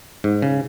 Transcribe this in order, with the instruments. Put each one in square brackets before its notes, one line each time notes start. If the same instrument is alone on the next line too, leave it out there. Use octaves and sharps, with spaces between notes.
[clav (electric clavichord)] G#2
C#3